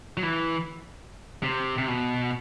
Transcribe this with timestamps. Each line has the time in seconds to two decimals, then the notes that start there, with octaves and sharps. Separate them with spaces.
0.17 F#3
0.23 E3
1.43 C3
1.78 C3
1.88 B2